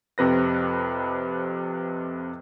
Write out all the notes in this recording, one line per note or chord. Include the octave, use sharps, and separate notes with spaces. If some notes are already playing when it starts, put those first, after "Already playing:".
F2 C3 B4 A#6